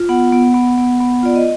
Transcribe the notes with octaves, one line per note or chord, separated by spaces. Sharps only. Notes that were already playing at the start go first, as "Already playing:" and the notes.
Already playing: F4
B3 F#5
B3
B3
B3
B3
F4 D5
D#5